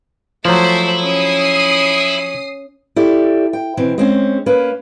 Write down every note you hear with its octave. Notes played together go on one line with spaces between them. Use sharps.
F3 F#3 A3 E4 C5
C#4 D#6 C7
E4 G4 A4 D5
G5
B2 E3 C4
G#3 C4 C#4
A#3 C#4 B4